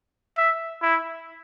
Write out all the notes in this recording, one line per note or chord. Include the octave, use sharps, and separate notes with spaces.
E5
E4